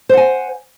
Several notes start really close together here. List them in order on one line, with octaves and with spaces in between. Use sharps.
C5 F#5 G#5